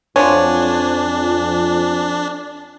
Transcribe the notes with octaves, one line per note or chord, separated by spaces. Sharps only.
F2 F3 F#3 D4 C#5 G#5